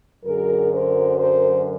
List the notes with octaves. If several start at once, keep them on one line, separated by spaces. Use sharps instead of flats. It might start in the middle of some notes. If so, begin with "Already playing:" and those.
F#2 D3 F#3 G#4 A#4
A#4 C5
A#4 C5